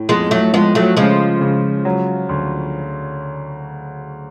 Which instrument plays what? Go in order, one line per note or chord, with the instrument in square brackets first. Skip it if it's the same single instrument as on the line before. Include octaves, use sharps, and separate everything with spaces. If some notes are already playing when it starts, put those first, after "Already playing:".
Already playing: [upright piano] A2
[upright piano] F2 [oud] G#3 B3
[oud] F#3 A3
[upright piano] F3 [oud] G#3 B3
[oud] F#3 A3
[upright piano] C#3 [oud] F3 G#3
[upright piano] C#3
F#3
D2